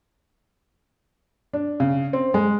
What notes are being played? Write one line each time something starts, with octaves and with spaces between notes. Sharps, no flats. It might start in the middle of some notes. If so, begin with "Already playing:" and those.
D4
C#3
C4
G#3